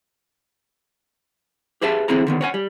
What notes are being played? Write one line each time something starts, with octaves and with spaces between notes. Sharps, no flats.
G4 G#4 B4 E5 A5
E2 D3 C4 E4 G#4 A#5
D3 D#3 B3
C#5 F#5 G#5
G3